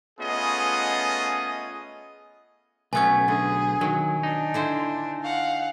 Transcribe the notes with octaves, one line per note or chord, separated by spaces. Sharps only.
A3 B3 C#4 F4 G#4 D#5
B1 B2 A3 B3 C#4 G#5 G#6
D3 G#4
D#3 F#3
D4 D#4
D3 E4 C5
F5 F#5